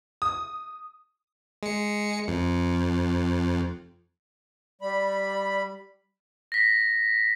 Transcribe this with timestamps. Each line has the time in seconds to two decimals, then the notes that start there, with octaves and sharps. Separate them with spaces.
0.22 D#6
1.63 G#3 C#7
2.28 F2
4.82 G3 D5 B5
6.52 A#6 B6